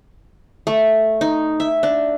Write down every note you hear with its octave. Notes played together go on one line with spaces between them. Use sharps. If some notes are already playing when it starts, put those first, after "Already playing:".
A3
D#4
E5
D4